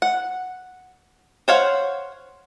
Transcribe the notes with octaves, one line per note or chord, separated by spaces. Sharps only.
F#5
C5 C#5 F5 F#5